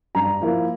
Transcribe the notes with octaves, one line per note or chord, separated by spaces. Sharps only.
G2 A#5
F3 A#3 E4